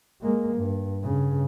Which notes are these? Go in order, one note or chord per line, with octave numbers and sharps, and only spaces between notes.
G#3 A#3
G2
G2 C#3